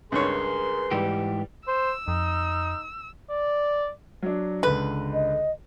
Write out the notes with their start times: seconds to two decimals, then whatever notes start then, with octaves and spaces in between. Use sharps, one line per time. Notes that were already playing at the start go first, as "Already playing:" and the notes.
0.12 C#2 G2 G#4 A#4 B4 C#5 C6
0.91 G#2 E3 G3 G4
1.68 C5 E6
2.08 F2 D#4
3.30 D5
4.22 F#3 D4
4.63 C#2 D3 B4
5.14 D#5